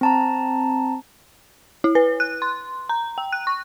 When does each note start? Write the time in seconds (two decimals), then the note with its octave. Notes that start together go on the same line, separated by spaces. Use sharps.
0.01 C4 A5 A#5
1.84 E4
1.95 B4
2.20 F#6
2.42 C6
2.89 A#5
3.18 G5
3.32 F#6
3.47 C#6